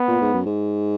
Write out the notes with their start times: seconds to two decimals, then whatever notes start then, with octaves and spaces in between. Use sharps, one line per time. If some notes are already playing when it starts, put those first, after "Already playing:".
Already playing: B3
0.08 A#2
0.21 G#2
0.33 F#2
0.46 G#2